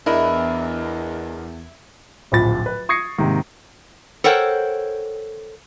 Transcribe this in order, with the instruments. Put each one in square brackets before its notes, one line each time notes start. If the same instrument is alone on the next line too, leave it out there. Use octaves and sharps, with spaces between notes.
[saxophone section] E2 [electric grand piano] D4 A#4 D#5 [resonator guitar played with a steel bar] E4
[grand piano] D1 A#1 F3 B5 A6
B4
C#6 D#6 G#6 A#6 C7 C#7
G#2 C3 D#3 A#3
[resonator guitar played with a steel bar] A4 A#4 C5 C#5 F#5 G5